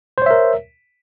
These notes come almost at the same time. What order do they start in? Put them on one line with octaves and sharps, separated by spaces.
C5 C#5 E5 A#4